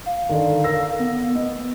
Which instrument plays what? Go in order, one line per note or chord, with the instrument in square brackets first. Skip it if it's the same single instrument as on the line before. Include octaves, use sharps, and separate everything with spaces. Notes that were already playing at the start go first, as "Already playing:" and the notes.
[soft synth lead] F5
[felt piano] D3 D#3
A#4 E6 A#6
[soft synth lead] B3
[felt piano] B3 [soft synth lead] D#5